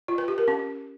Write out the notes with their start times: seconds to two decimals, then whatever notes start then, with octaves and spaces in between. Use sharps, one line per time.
0.08 F4
0.18 B4
0.28 G4
0.38 A#4
0.48 C#4